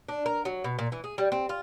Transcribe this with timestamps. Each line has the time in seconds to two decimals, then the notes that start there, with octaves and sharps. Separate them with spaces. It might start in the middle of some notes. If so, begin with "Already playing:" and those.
0.09 D4
0.26 A#4
0.45 F#3
0.64 B2
0.79 A#2
0.92 E3
1.04 G#4
1.18 G3
1.32 C4
1.49 F4